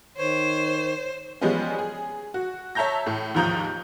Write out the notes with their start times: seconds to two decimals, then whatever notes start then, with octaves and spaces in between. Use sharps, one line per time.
0.17 D#3 C5 C#5
1.41 F3 G3 G#3 B3 C#4
1.79 G#4
2.34 F#4
2.75 C#5 E5 A5 A#5 G6 A#6
3.06 A2
3.35 D#2 G#2 F3 A#5 D#6 G6